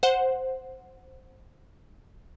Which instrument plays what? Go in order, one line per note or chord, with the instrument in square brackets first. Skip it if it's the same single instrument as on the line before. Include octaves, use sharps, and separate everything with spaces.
[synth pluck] C5 F#5